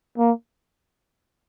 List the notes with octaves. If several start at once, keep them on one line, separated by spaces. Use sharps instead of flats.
A#3